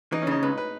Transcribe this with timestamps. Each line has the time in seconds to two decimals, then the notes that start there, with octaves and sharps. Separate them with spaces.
0.12 E3 D#4
0.22 C#4
0.27 C#3 D#4
0.43 C#2 B4
0.57 B4